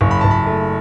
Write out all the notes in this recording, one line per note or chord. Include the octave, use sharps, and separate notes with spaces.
F#1 C#6
B5
F#1 A5
B5
A3